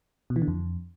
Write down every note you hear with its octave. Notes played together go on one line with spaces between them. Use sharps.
B2
E3
D3
F2